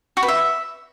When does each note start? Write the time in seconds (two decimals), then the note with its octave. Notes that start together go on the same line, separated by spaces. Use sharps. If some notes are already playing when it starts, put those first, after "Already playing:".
0.17 F#4
0.23 B4
0.28 E5